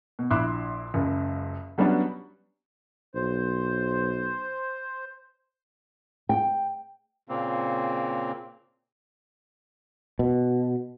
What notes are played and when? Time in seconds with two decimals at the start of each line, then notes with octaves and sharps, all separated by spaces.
0.19 B2
0.30 A#1 E4 E5 C6 D6 F#6
0.94 F#1 C#2
1.78 F#3 G3 B3 C#4 D4 F#4
3.15 B1 C5
6.29 G5
7.29 A#2 C#3 A#3 C4
10.19 B2